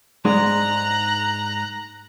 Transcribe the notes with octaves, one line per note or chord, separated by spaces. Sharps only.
G#2 G#3 D4 A#5 F#6